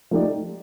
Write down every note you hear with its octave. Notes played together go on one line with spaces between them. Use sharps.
F3 A3 D#4 G4 D5